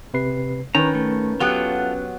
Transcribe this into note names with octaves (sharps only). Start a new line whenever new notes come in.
C3 B4 C7
D#3 C#4 B4 A#5
A3
F#3 B3 F4 G4 A4